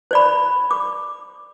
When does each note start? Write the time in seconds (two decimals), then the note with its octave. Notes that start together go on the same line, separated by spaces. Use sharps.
0.11 C5 D5 B5
0.71 D6